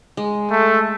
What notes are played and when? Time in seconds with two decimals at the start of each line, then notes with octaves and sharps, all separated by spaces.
0.17 G#3
0.51 A3